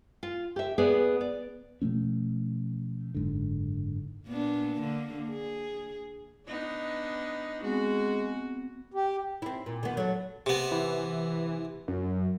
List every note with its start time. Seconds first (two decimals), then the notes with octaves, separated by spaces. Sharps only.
0.23 F4
0.56 G4 E5
0.78 B3 G#4 B4 D5
1.21 D5
1.82 B2 F3 A3 C#4
3.15 F#1 G#2 D3
4.27 A#2 B3 D4
4.80 D3 A#3
5.29 G#4
6.47 B3 D4 D#4
7.64 G#3 B3 C4 F#4
8.94 G4
9.42 C4 E4
9.66 A#2
9.83 D#3 B3
9.97 F#3 A3
10.46 C3 B3
10.72 E3
11.88 F#2